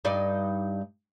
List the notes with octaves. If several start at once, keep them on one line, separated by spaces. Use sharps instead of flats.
G2 D#4 D5